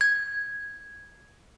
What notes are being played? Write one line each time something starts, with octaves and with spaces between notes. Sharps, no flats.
G#6